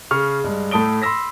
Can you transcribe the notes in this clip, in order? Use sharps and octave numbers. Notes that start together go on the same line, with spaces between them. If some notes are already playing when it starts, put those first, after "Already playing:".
C#3 C#6 F6
G2 G#3
A2 A3 A5 D#6 D7 G7
B5 C6 E6 A#6 B6